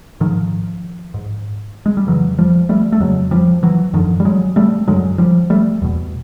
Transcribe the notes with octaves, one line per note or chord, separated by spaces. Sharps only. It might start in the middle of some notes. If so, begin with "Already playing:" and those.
G#2 D#3 F3
G#2
G#3
G3
F2 C#3 E3 F#3
F3 G3
G3 A3
A3
F2 C#3 F#3 G#3
F3 G3
E3 F#3
F#2 D3 D#3 F3
G3
F#3 G#3
G3 A3
F#2 D3 F#3 G#3
F3 G3
G3 A3
E2 B2